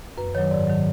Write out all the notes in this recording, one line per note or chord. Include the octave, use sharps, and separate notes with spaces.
F#2 B4
D#3 F#3 C#5
G#2 D5
D#3 F#3